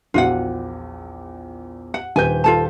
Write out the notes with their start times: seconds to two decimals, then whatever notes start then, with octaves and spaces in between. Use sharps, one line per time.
0.14 A#1 E2 A#2 F4 F#4 F#5
1.94 F#5
2.16 D#1 B4 G#5 G6
2.44 F4 A4 A5